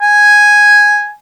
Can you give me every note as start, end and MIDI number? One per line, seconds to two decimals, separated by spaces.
0.01 1.11 80